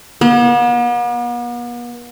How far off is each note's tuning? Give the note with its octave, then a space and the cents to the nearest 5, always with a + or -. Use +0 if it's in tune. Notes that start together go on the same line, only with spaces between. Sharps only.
B3 -45